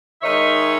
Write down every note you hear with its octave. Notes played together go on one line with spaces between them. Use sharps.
D#3 G#3 D#4 C#5 E5